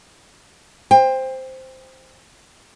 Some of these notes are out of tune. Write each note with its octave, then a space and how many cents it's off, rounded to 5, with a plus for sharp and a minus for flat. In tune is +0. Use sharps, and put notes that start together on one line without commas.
C5 +0 G5 +25